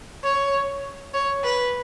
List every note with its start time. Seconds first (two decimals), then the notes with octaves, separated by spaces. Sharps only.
0.23 C#5
1.13 C#5
1.43 B4